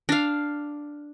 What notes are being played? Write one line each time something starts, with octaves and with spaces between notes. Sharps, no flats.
D4 F5